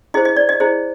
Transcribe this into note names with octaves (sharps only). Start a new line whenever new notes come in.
E4 G#4 C5 D#5
D#5
D5
D#5
E4 G#4 C5 D#5